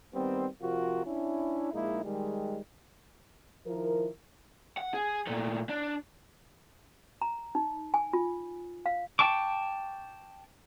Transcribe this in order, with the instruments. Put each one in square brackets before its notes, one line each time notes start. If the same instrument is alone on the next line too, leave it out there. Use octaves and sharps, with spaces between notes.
[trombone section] D#3 G3 B3 C4
C3 F3 F4 F#4 A#4
C#4 D4 E4
A#1 G#3 A#3 D#4 E4
D#3 G3 G#3
[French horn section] D#3 F3 E4 A#4
[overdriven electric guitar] F#5
G#4
A#2 A3
D4
[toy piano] A#5
D#4
G#5
F4
F5
[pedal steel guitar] G5 A5 C#6 D6